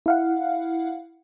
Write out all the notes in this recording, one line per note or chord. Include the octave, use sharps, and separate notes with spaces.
E4 F5 F#5